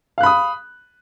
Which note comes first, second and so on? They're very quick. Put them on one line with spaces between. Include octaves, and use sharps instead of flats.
F5 F#6 B5 D#6